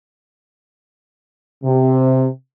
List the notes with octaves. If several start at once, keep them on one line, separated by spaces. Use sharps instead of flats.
C3